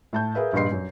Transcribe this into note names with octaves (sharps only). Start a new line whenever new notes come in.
A2 A5 G6
G#4 A#4 B4 E5 F5
A#1 G2 G3 D#5 C6 C7
F#2